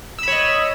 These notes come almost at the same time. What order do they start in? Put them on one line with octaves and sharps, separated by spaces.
E6 B5 C#5 D#5